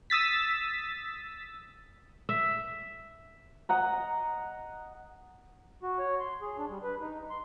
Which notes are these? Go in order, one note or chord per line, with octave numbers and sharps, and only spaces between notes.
D#6 E6 A6 B6
E5
D#5 F#5 A#5
F#4
C#5
C6
G#4
D4
G3
B4
D#4
C6